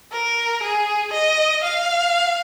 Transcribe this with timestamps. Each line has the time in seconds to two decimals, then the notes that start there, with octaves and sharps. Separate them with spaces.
0.12 A#4
0.63 G#4
1.13 D#5
1.64 F5